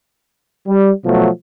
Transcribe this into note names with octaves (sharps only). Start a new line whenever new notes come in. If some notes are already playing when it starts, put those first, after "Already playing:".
G3
B2 F3 F#3 A3